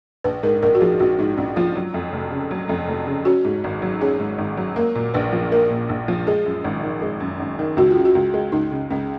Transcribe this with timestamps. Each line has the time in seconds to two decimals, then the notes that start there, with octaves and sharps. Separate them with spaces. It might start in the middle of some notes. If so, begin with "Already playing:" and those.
0.24 A#1 B4
0.43 G#2 A#4
0.63 A#1 A#4
0.75 F#4
0.81 F3 G#4
0.99 A#1 F#4
1.18 G#2 D#4
1.37 A#1 C#4
1.56 F3 F4
1.76 F#3
1.94 F2
2.13 F1
2.32 C#3
2.51 F#3
2.69 F2
2.88 F1
3.07 C#3
3.25 C#4 F#4
3.45 G#2
3.64 G#1
3.82 F#3
4.01 C#4 G#4
4.20 G#2
4.38 G#1
4.57 F#3
4.76 A#3 A#4
4.95 A#2
5.14 A#1 B4
5.33 F3
5.52 A#3 A#4
5.70 A#2
5.89 A#1
6.08 F3
6.27 G#3 G#4
6.45 F#2
6.64 G#1
6.83 D#3
7.02 G#3
7.20 F#2
7.40 G#1
7.59 D#3
7.77 C#2 F#4
7.91 F4
7.96 C#3
8.05 F#4
8.15 C#2
8.34 G#3
8.52 C#2 D#4
8.71 C#3
8.90 C#2 C#4